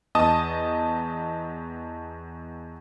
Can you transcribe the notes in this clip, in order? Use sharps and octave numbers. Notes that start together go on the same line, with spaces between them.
E2 D#5 A5 D#6